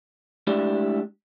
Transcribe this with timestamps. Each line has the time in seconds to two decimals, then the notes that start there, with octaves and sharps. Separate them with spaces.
0.47 G#3 A3 D4 E4 G4 D5